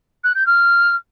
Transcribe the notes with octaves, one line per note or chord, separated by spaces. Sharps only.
F#6
G6
F6